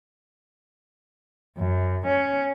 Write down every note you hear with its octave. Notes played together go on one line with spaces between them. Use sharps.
F#2
C#4